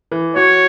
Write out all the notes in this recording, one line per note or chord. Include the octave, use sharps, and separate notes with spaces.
E3
F#4 C#5